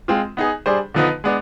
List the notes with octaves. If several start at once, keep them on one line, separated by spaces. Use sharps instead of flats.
G#3 C4 F4
B3 D#4 G#4
G3 D4 G#4 C5
D3 F3 B3 D#4 B4
G#3 B3 D4